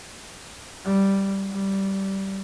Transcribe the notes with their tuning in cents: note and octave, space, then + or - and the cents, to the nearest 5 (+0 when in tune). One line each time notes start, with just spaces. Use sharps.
G3 -5
G3 -15